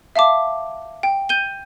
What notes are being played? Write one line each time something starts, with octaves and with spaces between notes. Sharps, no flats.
E5 F5 A5 D6
G5
G6 D#7 G7